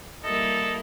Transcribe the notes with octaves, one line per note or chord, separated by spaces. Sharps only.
G3 A#3 E4 A4 D#5